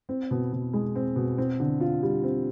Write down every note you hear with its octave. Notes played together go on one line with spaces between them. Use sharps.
C4
B2
B2
G#3
C4
B2
C4
D3
F4
G3
C4